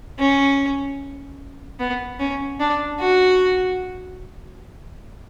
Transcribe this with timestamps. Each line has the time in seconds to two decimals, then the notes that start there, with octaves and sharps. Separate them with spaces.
0.20 C#4
1.79 B3
2.20 C#4
2.60 D4
3.00 F#4